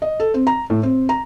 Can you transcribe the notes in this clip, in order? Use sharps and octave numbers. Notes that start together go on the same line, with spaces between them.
D#5
A4
C4
A#5
A2
C4
A#5